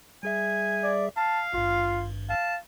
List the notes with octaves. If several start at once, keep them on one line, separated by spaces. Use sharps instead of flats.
G3 G#4 E5 G#5
D5
F5 A5
G#1 G2 F4
F5 A5